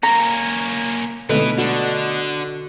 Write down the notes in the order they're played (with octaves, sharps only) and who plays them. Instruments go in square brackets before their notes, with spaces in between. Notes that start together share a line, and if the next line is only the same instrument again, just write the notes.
[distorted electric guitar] A#3 C#4 [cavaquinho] A#5
[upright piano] B2 A3 B3 [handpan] D3 [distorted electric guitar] E4 B4
[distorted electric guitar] D3 D4 [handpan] F#4